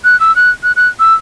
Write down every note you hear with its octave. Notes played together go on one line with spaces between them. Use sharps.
F#6
E6
F#6
F#6
F#6
E6